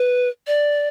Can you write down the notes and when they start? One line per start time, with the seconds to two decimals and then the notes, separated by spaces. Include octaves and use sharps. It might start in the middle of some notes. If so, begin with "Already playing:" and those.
Already playing: B4
0.47 D5